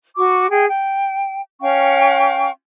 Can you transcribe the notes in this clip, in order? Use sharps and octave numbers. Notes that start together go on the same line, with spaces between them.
F#4 C#6 D6
G#4 G5
G5
C#4 F5 G5 C#6